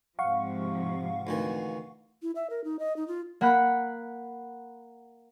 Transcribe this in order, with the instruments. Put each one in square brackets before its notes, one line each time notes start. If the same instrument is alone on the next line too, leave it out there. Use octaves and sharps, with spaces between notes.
[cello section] G#2 C3 F3 [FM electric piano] F5 F#5 C#6
[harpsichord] D2 D#3 E3
[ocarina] E4
E5
A#4
D#4
D#5
D#4
F4
[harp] A#3 F#5 B5 F#6